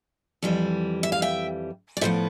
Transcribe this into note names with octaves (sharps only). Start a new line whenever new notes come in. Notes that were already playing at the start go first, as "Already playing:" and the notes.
F2 E3 G3
E5
F5
E5 G5
D5
A2 F3 B3 C5 E5